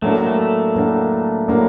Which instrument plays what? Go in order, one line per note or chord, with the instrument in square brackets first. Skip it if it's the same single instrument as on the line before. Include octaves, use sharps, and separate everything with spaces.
[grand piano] A2 F#3 A#3 D4 [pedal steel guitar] A3
[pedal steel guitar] A3
[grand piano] A2 F#3 A#3 D4
A2 F#3 A#3 D4